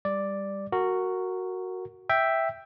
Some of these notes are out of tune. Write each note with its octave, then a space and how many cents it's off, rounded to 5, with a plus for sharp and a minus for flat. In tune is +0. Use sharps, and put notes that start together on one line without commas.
G3 +20 D5 +0
F#4 +0 A#4 -15
E5 +0 G5 +0